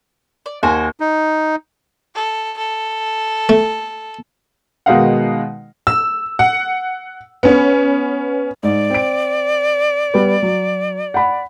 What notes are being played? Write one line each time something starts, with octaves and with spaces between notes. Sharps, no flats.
D5
D#2 F#4 C5 G#5
D#4
A4
A4
A3
B2 D#3 G#3 D#4 F5 F#5
E6
F#5
B3 C#4
G#2 D5
C4 D7
G3 B3
F#3
F#5 B5